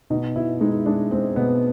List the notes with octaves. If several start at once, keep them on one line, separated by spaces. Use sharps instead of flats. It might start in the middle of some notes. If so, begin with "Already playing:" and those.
B2 D#4
B2 E4
G#3 D#4
G#3 D4
G#3 C4
B2 B3